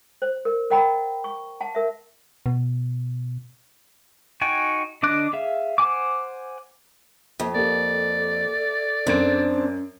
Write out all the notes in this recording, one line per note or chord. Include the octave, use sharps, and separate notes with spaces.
C5
A#4
A#4 D#5 F#5 G5 A#5 B5
C#6
F#5 A5
A#4 E5
B2
D#4 F#4 G5 G#5
D3 D4 D#5 D6 F#6
G#4 E5 F5
C5 F#5 G#5 D6
F2 A#3
A#3 G4 A4 D5
F#2 C4 D4 G#6 D7
C#4